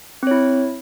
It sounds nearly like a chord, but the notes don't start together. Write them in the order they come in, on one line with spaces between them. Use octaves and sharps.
C4 C#5 E4